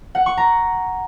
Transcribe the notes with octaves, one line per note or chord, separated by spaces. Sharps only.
F#5
C#6
A#5